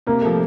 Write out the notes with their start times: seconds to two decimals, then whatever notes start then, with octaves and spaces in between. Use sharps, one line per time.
0.07 C3 A#3
0.23 F3 A3